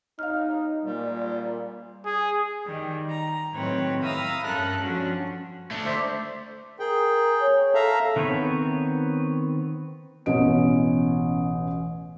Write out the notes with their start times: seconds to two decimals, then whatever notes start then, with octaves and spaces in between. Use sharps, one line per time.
0.19 D#4 F5 F6
0.84 A#2 G3
2.06 G#4
2.67 D#3 G3
3.10 A#5
3.54 A2 D#3 F#3 C4 B4 C#5
4.03 E5 F5 A#5 B5 D#6 E6
4.45 G2 C#4 A4 A#4 A5 F#6
4.82 F3 C#4 D4 F#4
5.71 A3 D4
5.85 C5 D5 E5
6.80 G#4 A#4 G5
7.41 C#5
7.75 A4 E5 F5 A#5
8.16 D#3 B3 C4 B4 C#5
10.26 A1 B2 C#4 D#5 D7